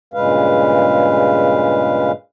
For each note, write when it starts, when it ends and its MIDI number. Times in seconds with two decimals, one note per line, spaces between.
0.14 2.12 43
0.14 2.12 46
0.14 2.12 49
0.14 2.12 56
0.14 2.12 71
0.14 2.12 77